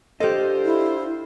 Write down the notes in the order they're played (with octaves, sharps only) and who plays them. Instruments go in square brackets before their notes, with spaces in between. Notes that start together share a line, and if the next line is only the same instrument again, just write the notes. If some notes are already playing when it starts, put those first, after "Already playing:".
[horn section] D4 F4 C5 [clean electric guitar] G4 D#5 [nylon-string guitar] A4 D5
[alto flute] E4